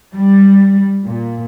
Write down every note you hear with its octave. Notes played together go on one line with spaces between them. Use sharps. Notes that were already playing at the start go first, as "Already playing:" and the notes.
G3
A#2